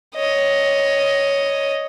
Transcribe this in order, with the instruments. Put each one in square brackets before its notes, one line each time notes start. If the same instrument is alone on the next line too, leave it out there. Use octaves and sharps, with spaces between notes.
[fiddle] C#5 D#5